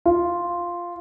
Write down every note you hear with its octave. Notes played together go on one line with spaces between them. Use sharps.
F4